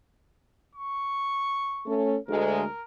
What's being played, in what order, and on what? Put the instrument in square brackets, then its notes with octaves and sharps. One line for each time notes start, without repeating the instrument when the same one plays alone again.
[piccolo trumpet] C#6
[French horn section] A3 C#4 A4
[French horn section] D2 G#3 G#4 [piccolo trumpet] A#4